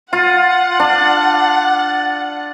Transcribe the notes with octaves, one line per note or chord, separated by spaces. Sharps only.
F4 F#5
D4